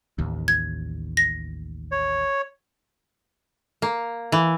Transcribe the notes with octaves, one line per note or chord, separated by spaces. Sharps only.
A1 D#2
G#6
A#6
C#5
A#3
E3